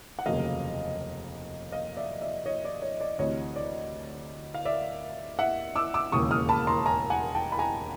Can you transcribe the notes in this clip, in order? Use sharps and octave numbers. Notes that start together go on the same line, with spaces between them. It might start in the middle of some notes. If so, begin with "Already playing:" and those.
F#5
F1 D#2 C#3 F#3 A#3 D#5 F5
D#5 F5
D5 E5
D5 E5
C#5 D#5
D5
C#5
D5
D2 C3 E3 C#5 D#5
D5
F5
D5 E5
E5 F#5
D6 E6
D6 E6
E1 D#2 C#3 C#6 D#6
D#6 F6
A5 B5
A#5 C6
G#5 A#5
F#5 G#5
G5 A5
B5
G#5 A#5